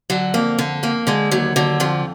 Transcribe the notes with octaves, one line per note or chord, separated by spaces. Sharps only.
D3 F#3
F2 A#3
D3
F2 A#3
D3 G#3
D#2 F#3
D3 F#3
F2 F3